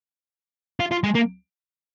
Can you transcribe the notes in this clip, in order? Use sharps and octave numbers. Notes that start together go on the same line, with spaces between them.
F4
F4
G#3
A#3